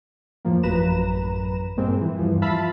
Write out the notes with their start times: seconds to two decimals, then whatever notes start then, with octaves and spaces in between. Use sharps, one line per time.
0.45 F2 A2 F3 A#3
0.63 A1 F#2 B4 A#5 E7
1.77 G2 A#2 G#3 A#3 C4
2.01 E3
2.17 E2 G2 E3 F3
2.42 F4 E5 F5 A5 B5